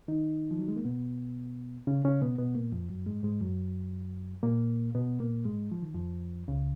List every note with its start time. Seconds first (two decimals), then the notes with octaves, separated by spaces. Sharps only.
0.08 D#3 D#4
0.51 F3
0.59 F#3
0.68 G#3
0.76 A#3
0.85 B2 B3
1.87 C#3 C#4
2.05 C#3 C#4
2.22 B2 B3
2.38 B2 B3
2.55 A#2 A#3
2.72 F2 F3
2.90 F#2 F#3
3.06 G#2 G#3
3.23 G#2 G#3
3.41 F#2 F#3
4.43 A#2 A#3
4.95 B2 B3
5.20 A#2 A#3
5.45 G#2 G#3
5.72 F3
5.82 D#3
5.94 F2 F3
6.48 C#2 C#3